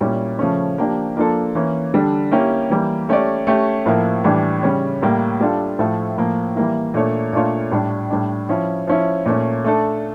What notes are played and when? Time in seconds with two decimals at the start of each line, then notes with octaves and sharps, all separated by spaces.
0.01 A#2 G3 C#4 E4
0.39 C#3 F3 A3 C#4
0.78 F3 A#3 D4 G4
1.16 F3 A#3 D4 F4 A4
1.55 E3 A#3 C#4
1.94 D3 G3 D4 A4
2.31 A#3 C#4 E4 G4
2.70 E3 G3 A#3
3.09 A3 C#4 G4 D5
3.47 A3 C#4 G4
3.86 A2 F3 A#3 E4 A#4
4.24 A2 E3 G3 D4 G4
4.63 C#3 G3 C#4
5.02 A2 G3 A#3
5.41 G3 D4 F4 A4
5.79 A2 F3 A3 E4 A4
6.17 A2 F3 A#3
6.55 E3 G3 A#3 E4
6.94 A#2 A3 D4 A4 C#5
7.33 A#2 A3 D4 F4 C#5
7.71 A2 G3 D4
8.10 A2 G3 D4
8.49 F3 C#4 E4
8.87 F3 C#4 E4
9.26 A#2 A3 C#4
9.65 A3 D4 A4